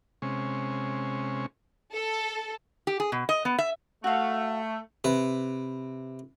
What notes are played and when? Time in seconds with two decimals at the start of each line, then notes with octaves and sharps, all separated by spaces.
0.22 C3 G#3 C#4
1.93 A4
2.87 G4
3.00 G#4
3.12 B2
3.29 D#5
3.45 B3
3.59 E5
4.04 A3 F#4 F5
5.04 C3 B4